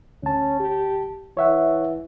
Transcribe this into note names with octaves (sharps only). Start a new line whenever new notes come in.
D2 C#4 A5
G4
E3 C#5 E5 F#5